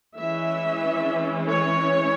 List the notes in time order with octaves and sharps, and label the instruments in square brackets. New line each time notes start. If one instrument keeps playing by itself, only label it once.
[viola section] E3 G#3 C#4 E5
C#5